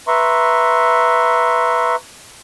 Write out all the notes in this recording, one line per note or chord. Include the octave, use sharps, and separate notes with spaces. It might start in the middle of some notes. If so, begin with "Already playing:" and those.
B4 E5 A#5 C6 C#6